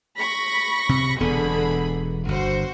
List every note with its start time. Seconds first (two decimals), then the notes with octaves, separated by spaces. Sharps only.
0.18 B5 C#6 A#6
0.89 C3
1.20 E1 D3 B3 G#4 B5
2.28 G1 F#4 C5